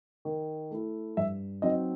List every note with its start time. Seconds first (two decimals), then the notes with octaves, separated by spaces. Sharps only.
0.25 D#3
0.71 A3 E4
1.17 G2 E5
1.62 F#3 C4 D#4 D#5